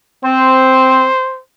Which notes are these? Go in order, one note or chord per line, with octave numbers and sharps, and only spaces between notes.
C4 C5